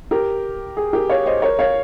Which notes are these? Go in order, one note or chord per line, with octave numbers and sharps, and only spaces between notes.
G4 A#4
G#4
G4 A#4
C#5 F5
C5 D#5
A#4 C#5
C#5 F5